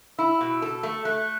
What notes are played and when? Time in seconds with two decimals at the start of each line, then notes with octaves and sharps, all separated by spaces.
0.18 E4 E6
0.41 B2
0.62 A4
0.83 A3
1.05 A3 F#6